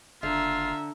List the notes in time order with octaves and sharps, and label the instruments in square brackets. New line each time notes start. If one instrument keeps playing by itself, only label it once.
[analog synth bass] F#1 [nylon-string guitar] D3 [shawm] F4 [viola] E5 A#5